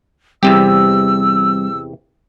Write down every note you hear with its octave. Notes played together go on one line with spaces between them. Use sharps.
E2 C3 G3 C4 G4 E6